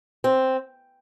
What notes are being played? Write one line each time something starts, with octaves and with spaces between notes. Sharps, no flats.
C4